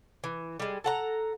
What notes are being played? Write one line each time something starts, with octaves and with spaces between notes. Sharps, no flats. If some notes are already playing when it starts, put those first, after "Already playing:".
E3
G3 G#3
A4 F#5 A#5